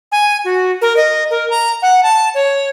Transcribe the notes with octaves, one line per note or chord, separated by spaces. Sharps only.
G#5
F#4
A#4
D#5
A#4
A#5
F#5
A5
C#5